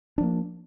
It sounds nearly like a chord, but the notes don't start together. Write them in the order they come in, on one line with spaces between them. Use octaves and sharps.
D4 F3 A#3